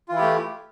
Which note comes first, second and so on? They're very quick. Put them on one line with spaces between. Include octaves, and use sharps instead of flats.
F4 E3 E4 G4 A3